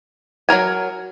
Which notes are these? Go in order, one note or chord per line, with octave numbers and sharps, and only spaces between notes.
F#3 F4 A#4 G#5